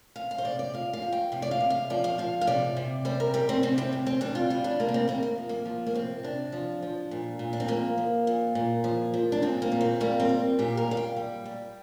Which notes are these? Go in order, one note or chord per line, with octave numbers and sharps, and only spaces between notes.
C3 F5
F5
C5
C3 D5
D5
F3 F5
F5
F3
G5
C3 F5
D5
F5
C3
F5
F3 D5
F5
F3 F5
F5
C3 D5
C3
G3 C5
A#4
G3 G4
C4
C3 C4
C4
C3
C4
G3 D4
F4
G3 F4
D4
C3 A#3
D4
C4
C3 A#3
A#3
F3
A#3
F3
A#3
C3 C4
C3 D4
F3
F3
A#2
A#2
D4
C4
F3 A#3
F3
A#2
A#2
F3
F3
D4
A#2 C4
A#3
A#2
C4
G3 A#3
C4
G3
A#2 G4
A#4
A#2 F5
G5
G3
G3